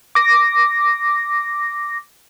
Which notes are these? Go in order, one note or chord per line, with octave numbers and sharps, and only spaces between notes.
D6 A#6